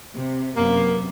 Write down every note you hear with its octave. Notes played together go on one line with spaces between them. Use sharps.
C3
F#2 C3 A#3 B3